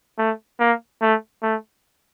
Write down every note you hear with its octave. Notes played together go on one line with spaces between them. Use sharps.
A3
A#3
A3
A3